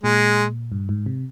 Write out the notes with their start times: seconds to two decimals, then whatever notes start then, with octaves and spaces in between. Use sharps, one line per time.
0.04 A#2 G#3
0.72 G2
0.89 G#2
1.06 C3